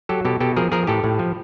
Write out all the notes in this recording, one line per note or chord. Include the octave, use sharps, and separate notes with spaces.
F#3 G4 A4
B2 G4 A4
B2 G4 A4
F3 G#4 A#4
F3 G#4 A#4
A2 G4 A4
A2
F3